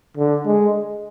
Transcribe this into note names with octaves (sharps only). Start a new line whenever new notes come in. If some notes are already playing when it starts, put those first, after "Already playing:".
D3
G#3